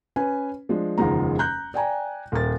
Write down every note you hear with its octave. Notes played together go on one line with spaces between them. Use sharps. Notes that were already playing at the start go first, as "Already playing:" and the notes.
C#4 B4 G#5
F3 G#3 D4
F#1 E2 D#3 F3 G#3 A#5
A#5 F#6 G6
D5 G5 G#5 A#5
D#1 A#4 A6